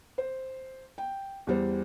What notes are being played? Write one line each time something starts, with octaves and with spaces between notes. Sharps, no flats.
C5
G5
E2 G3 C5